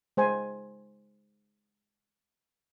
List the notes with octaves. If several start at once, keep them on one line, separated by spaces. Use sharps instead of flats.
G#3 C5 G#5